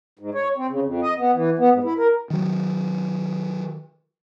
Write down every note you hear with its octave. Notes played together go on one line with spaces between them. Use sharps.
G#2
C#5
C4
C#3
F2
D#5
B3
E3
B3
G#2
E4
A#4
D#3 F#3